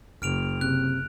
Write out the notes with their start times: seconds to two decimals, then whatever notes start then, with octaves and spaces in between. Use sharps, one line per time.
0.22 F#1 F6 D7 F7
0.61 C3 F#6